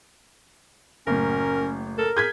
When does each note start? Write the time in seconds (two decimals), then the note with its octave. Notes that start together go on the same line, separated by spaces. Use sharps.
1.07 F#1 A2 C#4 A#4
1.98 A4 A#4
2.17 G#4 G6 G#6 B6